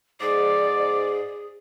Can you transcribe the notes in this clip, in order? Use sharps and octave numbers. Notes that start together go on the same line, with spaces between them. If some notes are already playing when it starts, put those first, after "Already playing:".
G#2 G#4 D5